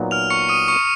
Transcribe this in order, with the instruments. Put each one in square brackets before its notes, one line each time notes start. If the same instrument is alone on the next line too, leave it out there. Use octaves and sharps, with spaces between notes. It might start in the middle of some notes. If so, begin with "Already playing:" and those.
Already playing: [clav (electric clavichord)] A#2 F#3 B3 D#4
[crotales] F6 F7
C#6 C#7
D#6 D#7
C#6 C#7